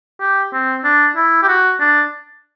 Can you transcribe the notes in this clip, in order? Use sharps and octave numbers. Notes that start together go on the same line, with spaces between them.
G4
C4
D4
E4
G4
F#4
D4